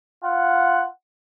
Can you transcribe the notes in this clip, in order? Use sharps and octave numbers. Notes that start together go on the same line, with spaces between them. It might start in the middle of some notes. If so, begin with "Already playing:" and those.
F4 F#5